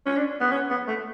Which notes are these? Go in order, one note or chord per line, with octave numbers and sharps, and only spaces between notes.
C#4
D4
B3
C#4
B3
A3